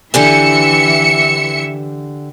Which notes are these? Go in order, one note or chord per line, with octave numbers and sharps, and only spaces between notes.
D3 E3 G4 E5 G#5 C#7